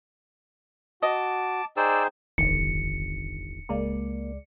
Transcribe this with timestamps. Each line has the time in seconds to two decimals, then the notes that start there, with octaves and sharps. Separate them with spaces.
1.03 F#4 D#5 A5 D6
1.77 D#4 G#4 C5 D5 G5 E6
2.38 D1 G1 E2 D3 D#3 C#7
3.69 C#2 G#3 A#3 D5